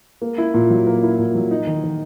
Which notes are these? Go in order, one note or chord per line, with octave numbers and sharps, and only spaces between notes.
A#3
E4
A#2
F#3
A#3
E4
A#2
F#3
D#4
D#3
D#3